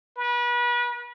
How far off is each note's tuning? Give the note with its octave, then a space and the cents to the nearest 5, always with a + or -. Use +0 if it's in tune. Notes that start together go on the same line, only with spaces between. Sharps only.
B4 -35